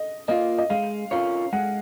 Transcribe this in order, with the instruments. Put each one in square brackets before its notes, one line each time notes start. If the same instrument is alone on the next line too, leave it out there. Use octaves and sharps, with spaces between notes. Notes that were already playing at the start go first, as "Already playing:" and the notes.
Already playing: [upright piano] D#5
[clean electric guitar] A#3 F4 [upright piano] D#5
[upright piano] D#5
[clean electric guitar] G#3 [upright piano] F5
[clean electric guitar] C#4 F4 A#4 C#5 [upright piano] F5
[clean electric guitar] G#3 [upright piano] F#5